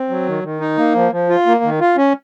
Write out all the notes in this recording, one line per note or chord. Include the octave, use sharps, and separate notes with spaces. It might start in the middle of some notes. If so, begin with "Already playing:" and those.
Already playing: C4
F#3
D#3
D#3
D#4
A#3
F3
F3
F4
A#3
D#3
F4
C#4